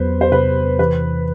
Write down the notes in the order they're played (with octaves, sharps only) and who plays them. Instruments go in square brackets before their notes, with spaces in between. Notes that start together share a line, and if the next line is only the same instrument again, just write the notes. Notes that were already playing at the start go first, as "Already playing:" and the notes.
Already playing: [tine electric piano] E2 F#3 B3 [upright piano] B4 C5
[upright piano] C5
[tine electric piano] C3 [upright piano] B4
[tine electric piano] E3 [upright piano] B4